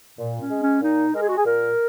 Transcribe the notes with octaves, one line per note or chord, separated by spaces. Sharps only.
A#2
C#4
G#3
C#4
A#2 D#4
G#3 A#4
G#4
F#4
G#4
A#2 A#4